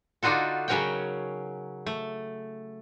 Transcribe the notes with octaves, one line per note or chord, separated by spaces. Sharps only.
D3 D4 D#4 F4 F#4 A4
C#3 F#3 C#4 A#4 F#5 G5
A3